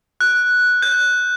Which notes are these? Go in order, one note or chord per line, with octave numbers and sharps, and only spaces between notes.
F#6
G6